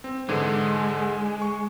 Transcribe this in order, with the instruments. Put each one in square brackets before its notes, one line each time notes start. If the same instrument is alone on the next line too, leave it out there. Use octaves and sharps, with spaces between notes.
[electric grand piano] C4
[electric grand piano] G#2 D3 E3 [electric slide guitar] G#3
[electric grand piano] C#6